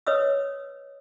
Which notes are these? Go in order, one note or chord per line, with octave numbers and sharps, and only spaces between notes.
B4 C#5 D#5 D#6 E6